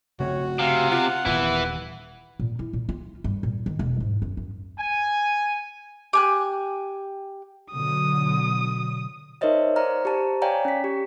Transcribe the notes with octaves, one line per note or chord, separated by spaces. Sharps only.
C#3 A3 C4 F#4 C#5
C3 F5
F4 F#5
D#1 E3 B3 E4
A#2
E4
A#2
F4
G2
A#2
D#3
E1
G#2
F#2
F#2
G#5
G4 G#5 F#6
B2 D3 F#3 D#6
D#4 A#4 C5 C#5 D#5 E5
C5 D5 F5 A#5 F6
G4 C5 A5 A#5
C#5 D5 F5 G5 G#5 A#5
C#4 B6
G4